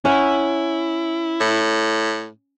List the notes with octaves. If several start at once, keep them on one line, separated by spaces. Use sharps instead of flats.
C#4 E4 F#5
A2